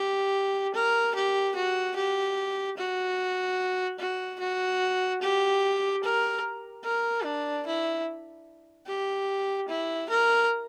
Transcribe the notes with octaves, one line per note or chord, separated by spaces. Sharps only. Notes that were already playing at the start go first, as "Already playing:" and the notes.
Already playing: G4
A#4
G4
F#4
G4
F#4
F#4
F#4
G4
A#4
A#4
D4
E4
G4
E4
A#4